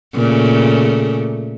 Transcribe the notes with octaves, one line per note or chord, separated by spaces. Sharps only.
A#2 C#3 A3